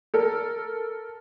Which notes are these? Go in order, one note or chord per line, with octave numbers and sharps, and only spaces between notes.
A4 A#4